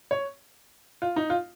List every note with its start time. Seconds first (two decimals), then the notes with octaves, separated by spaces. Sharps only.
0.11 C#5
1.02 F4
1.16 D#4
1.30 F4